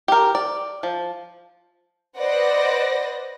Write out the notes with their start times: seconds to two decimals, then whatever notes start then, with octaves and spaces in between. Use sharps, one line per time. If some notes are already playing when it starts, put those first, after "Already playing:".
0.08 G4 A#4
0.35 D5
0.83 F3
2.17 B4 C5 D5 D#5 F#5 A#6